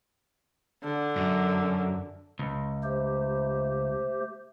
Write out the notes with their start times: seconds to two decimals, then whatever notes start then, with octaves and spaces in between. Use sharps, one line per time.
0.83 D3
1.16 F#2
2.39 C#2
2.84 A3 G4 C5